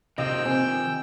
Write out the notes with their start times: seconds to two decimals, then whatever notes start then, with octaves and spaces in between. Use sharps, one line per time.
0.18 C3 D#3 F3 D#5 G5 E6
0.45 C3 C5 G#5